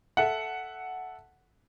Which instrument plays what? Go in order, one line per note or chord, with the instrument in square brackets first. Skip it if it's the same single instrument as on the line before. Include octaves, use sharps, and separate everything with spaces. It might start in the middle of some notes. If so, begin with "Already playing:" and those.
[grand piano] A4 E5 F#5